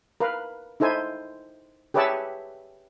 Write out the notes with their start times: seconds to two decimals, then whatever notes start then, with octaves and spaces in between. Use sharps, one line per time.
0.20 A#4 B4 F5
0.80 D#4 E4 A4 C5 G#5
1.94 G4 G#4 B4 C#5 E5 A5